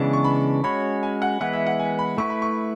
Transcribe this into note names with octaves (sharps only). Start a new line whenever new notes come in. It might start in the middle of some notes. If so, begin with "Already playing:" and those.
Already playing: C#3 E3 G#3 B3 D4 A5
C#6
B5
G#3 C#4 F#4 C#5 B5
G#5
F#5
E3 G#3 B3 E4 B4 F#5
E5
F#5
G#5
B5
A3 E4 B4 C#6
B5
C#6